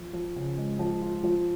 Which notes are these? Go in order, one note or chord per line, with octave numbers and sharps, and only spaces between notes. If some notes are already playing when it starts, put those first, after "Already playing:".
Already playing: F3
F3
C#3
G#3
F3
F4
F3